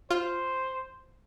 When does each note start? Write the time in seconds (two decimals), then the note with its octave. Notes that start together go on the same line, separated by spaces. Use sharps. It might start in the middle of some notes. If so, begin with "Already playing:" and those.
0.11 F4 C5